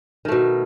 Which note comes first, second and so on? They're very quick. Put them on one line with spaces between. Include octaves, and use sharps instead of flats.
D#3 A3 B2